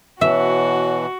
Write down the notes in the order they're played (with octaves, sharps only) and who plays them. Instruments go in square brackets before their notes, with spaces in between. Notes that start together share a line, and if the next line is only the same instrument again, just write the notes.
[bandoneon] B2 E3 [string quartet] F#4 [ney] C#5 [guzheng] E5